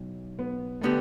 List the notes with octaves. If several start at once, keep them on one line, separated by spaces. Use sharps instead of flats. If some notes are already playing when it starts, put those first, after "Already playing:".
Already playing: B1
B3
D3 A3 B3 G4